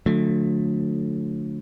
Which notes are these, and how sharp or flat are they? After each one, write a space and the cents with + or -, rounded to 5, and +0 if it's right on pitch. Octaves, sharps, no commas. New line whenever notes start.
D3 +0 F#3 -45 A3 +0